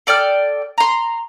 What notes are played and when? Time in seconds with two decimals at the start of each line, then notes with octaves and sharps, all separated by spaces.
0.07 A4 D5 G5 F6
0.78 A#5 C6